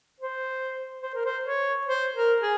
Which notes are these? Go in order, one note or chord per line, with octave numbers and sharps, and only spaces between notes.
C5
C5
A#4
C5
C#5
C5
A#4
G#4